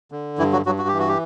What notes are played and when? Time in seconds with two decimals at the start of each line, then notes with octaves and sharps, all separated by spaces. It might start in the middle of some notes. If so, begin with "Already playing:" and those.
0.12 D3
0.38 G2 E3 E4
0.52 F#3 F#4
0.66 G2 F#3 F#4
0.78 F#4
0.88 E3 G4
0.99 F#4
1.08 G4